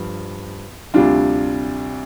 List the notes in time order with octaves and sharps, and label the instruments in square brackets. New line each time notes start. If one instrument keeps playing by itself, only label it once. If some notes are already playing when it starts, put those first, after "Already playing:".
Already playing: [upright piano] G2 F3
D2 C3 G3 D4 F4